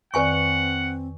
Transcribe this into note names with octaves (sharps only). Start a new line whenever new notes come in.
F2 D#3 C4 B4 D5 F#5 G#5 C#6